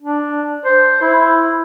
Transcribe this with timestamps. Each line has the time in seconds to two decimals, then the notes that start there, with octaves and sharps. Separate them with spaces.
0.02 D4
0.65 C5
1.02 E4